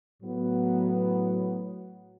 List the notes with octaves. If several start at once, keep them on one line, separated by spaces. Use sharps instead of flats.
A2 F#3 B3